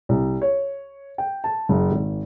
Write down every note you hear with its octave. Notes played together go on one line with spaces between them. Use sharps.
C2
C#5
G5
A5
F#1
G#1